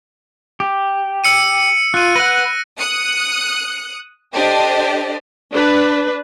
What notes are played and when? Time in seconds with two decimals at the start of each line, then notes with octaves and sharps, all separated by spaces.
0.60 G4
1.24 E6 C#7 D#7
1.94 F4 F#6 D#7
2.16 B4 F#5 A#6
2.78 D#6 F#6 C#7
4.32 D4 G4 A4 C5 D5 D#5
5.52 D4 B4